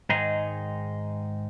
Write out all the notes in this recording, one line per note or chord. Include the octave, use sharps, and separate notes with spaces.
G#2 D#3 G#3 D#4 G#4